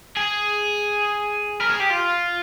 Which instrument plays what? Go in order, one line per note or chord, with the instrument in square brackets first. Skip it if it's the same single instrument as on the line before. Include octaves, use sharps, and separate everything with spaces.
[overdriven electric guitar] G#4
A#4
G#4
G4
F4